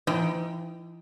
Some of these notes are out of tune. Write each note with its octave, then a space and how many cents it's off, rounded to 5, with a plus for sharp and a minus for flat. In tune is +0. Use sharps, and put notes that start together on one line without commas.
E3 +40 D#4 +20 G5 +0